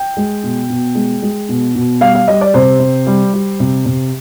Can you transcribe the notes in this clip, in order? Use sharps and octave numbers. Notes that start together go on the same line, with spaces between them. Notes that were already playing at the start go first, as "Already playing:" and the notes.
Already playing: G5
G#3
B2
B2
G#3
G#3
B2
B2
G3 F5
F5
G3 D#5
D5
C3 C5
C3
G3
G3
C3
C3